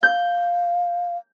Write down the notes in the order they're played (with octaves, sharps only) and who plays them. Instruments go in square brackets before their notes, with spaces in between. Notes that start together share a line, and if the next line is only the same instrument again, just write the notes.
[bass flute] F5 [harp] G6